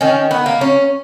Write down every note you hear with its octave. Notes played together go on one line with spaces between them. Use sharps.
D#3 C#4
B3
A#3
C#4